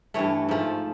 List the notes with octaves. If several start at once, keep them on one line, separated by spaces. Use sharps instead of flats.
G2 E3 A3 C#5
G#2 F3 A3